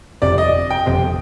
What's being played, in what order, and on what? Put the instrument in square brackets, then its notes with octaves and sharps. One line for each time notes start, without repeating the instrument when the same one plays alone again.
[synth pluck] G1 F2 C3 [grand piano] D5
[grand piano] D#5
G5
[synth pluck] G1 F2 C3